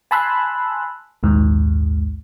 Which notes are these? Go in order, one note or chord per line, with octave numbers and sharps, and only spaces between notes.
G#5 A5 B5 C6 E6 F#6
A#1 D#2 G#2